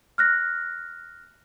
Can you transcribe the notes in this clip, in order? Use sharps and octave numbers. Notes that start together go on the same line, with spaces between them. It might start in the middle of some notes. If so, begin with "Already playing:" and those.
F6 F#6 A#6